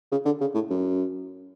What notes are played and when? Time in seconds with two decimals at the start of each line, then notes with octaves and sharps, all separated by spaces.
0.11 C#3
0.25 D3
0.41 C#3
0.54 A2
0.70 F#2